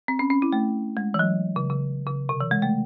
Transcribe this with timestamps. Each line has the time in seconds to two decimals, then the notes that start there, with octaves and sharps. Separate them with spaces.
0.08 C4
0.19 C#4
0.30 C#4
0.42 E4
0.53 A3
0.97 G#3
1.14 E3
1.19 F#3
1.56 C#3
1.70 C#3
2.07 C#3
2.29 C3
2.40 E3
2.51 G#3
2.62 A3